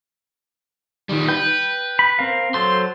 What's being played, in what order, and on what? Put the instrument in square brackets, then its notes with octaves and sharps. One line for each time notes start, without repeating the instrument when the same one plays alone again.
[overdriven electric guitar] D#3 G3
[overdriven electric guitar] B4 [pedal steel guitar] G5
[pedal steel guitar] B5
C4 A#4 F5
[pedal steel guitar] F#3 A4 C5 [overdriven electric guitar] C6